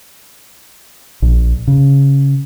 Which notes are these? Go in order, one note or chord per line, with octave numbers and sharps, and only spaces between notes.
A#1
C#3